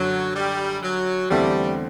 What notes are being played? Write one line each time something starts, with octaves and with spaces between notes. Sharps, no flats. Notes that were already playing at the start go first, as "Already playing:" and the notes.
Already playing: F#2 D3 F#3
G3
F#3
E2 D3 G3 A3 C4 E4